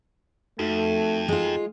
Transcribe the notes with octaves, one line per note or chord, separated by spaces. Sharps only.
F2 A3 D#4 F#4 A4
G#3 F4